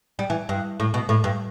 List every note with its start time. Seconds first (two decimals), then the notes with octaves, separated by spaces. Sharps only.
0.19 G3
0.30 E3
0.49 G2
0.80 A2
0.94 B2
1.09 A2
1.24 G2